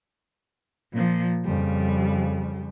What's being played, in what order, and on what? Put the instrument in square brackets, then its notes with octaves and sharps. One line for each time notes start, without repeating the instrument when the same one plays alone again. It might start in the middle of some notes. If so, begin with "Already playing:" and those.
[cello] A#2 F3
[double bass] F2 C#3 [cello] G3